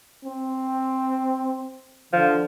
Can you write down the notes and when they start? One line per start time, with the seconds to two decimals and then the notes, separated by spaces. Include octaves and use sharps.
0.25 C4
2.13 D3 F3